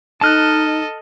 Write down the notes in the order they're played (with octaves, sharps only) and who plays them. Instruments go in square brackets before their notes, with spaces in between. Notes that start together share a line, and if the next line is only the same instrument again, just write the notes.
[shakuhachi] D#4 [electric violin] A4 D#5 [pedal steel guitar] A5 F6 F#6